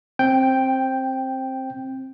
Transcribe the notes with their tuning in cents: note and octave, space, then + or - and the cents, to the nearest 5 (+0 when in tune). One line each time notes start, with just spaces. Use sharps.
C4 +15 G5 +0